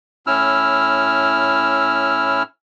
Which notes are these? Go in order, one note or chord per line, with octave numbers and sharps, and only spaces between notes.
A2 C#4 E4 E6 F6